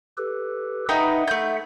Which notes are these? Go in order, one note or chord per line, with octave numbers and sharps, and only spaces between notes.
G4 A4 B4
D#4 B4 E5 F#5 G5
A3 G6